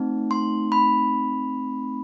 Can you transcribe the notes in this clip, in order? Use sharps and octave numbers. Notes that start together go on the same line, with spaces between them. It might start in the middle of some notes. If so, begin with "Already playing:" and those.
Already playing: A3 C4 D#4
C6
B5